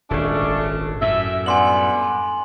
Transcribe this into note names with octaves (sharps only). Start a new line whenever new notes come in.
D#1 G#1 C#3 A3 D4
F#2 A2 E5
D3 G3 B3 G#5 C6 F#7